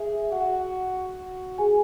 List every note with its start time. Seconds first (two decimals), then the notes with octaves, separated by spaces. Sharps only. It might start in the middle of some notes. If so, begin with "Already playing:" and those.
Already playing: G#4 E5
0.32 F#4 F#5
1.58 G#4 G#5